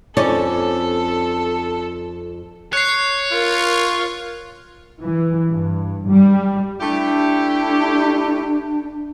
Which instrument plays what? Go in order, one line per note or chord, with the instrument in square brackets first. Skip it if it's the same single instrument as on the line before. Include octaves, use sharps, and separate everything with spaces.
[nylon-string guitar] F2 D#4 D5 [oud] C#4 [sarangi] A4
[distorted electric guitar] C#5 [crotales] F#6 C7
[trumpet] F4 [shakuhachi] A#4
[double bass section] E3
G2
G3
[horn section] A3 E4 G4 [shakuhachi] D4